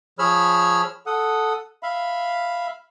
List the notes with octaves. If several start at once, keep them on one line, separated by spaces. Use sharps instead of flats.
F3 G#4 C#5 B5 E6 F6
A4 F#5 D#6
E5 F5 B5